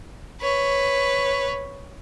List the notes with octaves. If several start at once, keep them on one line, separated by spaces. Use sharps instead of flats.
B4 C#5